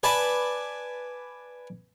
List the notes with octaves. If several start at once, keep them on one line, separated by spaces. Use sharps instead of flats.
B4 D5 G#5 A5 B5